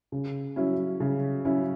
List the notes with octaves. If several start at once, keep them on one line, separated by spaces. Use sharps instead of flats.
C#3
F#3 C#4 E4
C#3
F#3 C#4 E4